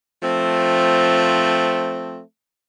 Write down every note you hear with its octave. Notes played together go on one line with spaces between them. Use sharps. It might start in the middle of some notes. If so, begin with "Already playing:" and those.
F3 A3 C4